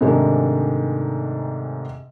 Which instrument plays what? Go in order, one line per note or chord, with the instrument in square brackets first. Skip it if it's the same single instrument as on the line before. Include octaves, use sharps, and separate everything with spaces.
[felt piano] G#2 C3 D#3 G#3 A3 D4